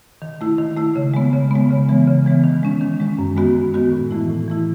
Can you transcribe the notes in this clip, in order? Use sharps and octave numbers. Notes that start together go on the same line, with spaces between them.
D#3
A3 E4
D#3
A3 E4
C#3
G#3 B3
C#3
G#3 B3
C#3
E3 G#3 B3
C#3
E3 G#3 B3
D#3
G#3 C#4
D#3
G#3 C#4
F#2
D#3 G#3 B3 F#4
F#2
D#3 G#3 B3 F#4
A2
E3 A3 E4
A2
E3 A3 E4